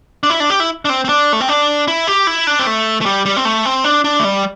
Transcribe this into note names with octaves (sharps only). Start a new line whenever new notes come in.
D4
E4
D4
G4
E4
D4
C4
C4
D4
A3
C4
D4
E4
G4
E4
D4
C4
A3
A3
G3
G3
C4
A3
C4
D4
D4
A3
G3